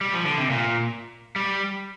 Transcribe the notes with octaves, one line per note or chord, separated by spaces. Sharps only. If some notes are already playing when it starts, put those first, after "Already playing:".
G3
F3
D3
C3
A#2
G3